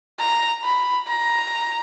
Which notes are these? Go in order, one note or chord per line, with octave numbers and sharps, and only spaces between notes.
A#5
B5
A#5